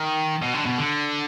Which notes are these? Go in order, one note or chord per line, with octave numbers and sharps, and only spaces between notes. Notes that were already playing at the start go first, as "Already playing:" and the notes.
Already playing: D#3
B2
D3
B2
D3